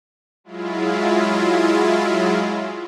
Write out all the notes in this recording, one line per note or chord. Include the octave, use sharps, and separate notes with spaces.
F#3 G#3 E4 F4